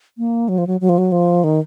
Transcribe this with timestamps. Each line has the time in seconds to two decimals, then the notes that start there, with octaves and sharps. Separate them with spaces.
0.18 A#3
0.49 F#3
0.58 F3
0.67 F#3
0.81 F#3
0.89 F3
0.98 F#3
1.12 F3
1.44 D#3